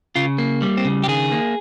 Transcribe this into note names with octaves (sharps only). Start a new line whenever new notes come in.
C#3 F4
A#3
G3
C4
C#3
G4
D#3 G#4
A#3